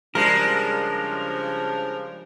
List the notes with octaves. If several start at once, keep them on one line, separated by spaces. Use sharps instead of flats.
C#3 F3 G3 G#3 D4 A#4